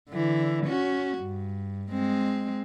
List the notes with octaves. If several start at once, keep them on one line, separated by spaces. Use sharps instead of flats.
D3 E3
C#4 F#4
G2
G#3 C4